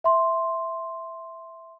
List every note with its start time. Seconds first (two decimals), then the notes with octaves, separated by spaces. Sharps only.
0.04 E5 C6